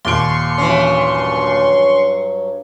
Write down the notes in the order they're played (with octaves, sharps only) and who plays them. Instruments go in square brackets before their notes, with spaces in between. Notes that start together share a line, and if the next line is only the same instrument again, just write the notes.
[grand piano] D#2 A#2 D7 [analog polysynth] C6 C#6
[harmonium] G2 F#3 [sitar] E3 C#4